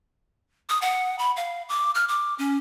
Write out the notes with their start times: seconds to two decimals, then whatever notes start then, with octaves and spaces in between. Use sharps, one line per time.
0.69 D#6
0.82 F#5
1.19 B5
1.36 F5
1.69 D6
1.95 F6
2.08 D6
2.38 C#4